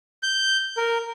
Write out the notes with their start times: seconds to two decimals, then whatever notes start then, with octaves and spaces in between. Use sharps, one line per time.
0.23 G6
0.77 A#4